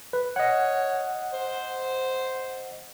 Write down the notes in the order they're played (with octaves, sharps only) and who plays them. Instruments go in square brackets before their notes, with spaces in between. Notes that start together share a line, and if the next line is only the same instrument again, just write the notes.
[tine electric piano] B4
[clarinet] C#5 [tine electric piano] D#5 F#5
[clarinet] C5